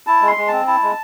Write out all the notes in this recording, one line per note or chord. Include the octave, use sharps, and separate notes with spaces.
E4 A5
G#3
C6
G#3
C4 A5
E4 A5
G#3